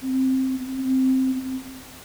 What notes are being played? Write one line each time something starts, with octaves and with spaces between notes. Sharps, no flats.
C4
C4